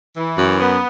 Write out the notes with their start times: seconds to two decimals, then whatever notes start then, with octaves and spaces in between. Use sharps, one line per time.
0.16 E3
0.38 F#2
0.59 B3